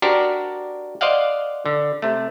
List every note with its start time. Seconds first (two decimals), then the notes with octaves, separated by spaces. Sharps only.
0.02 D4 F#4 G4 A#4 C5
1.01 C5 D5 D#5 F5 F#5
1.66 D3
2.02 C3 A3